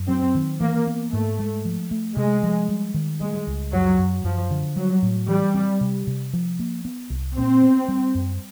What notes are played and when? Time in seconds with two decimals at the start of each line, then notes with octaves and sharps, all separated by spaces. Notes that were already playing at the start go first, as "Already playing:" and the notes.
Already playing: F#2
0.09 F#3 C4
0.35 D#3
0.60 E3 A#3
0.87 B3
1.13 G#2 A3
1.40 G#3
1.65 F3
1.91 A3
2.17 C3 G#3
2.43 F3
2.69 G3
2.94 D#3
3.21 G3 G#3
3.47 C#2
3.73 F#2 F#3
3.99 F#2
4.24 F#2 F3
4.51 D3
4.76 F#3 G3
5.02 A2
5.28 E3 G3
5.54 C4
5.81 C3
6.07 C3
6.33 F3
6.59 A#3
6.85 B3
7.10 C2
7.36 A#2 C4
7.63 B3
7.88 G3
8.15 F#2